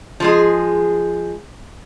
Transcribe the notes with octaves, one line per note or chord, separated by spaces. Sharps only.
F3 G#3 G#4